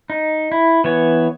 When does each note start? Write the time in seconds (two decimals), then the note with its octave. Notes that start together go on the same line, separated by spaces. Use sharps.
0.10 D#4
0.52 E4
0.84 E3 B3 C#5